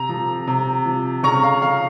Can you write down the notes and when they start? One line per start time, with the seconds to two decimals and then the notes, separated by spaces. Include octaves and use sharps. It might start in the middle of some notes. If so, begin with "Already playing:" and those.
Already playing: C3 A#5
0.09 F3
0.47 C3
0.86 F3
1.23 C#3 A#5 C#6
1.43 F5
1.62 F3 F5